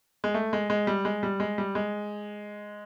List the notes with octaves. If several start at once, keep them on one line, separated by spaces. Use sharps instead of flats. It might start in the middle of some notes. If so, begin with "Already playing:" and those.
G#3
A3
G#3
G#3
G3
G#3
G3
G#3
G3
G#3